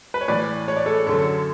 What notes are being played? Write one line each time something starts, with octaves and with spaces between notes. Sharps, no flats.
B4
C#5
A2 E3 B4 D5
C#5
D5
A4 C#5
F#2 D3 F#3 A4 C#5